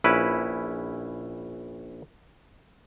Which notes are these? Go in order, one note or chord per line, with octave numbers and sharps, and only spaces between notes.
A#1 C#4 E4 B4